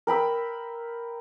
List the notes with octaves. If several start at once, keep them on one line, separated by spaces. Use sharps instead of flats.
A#4 G5 B5 E6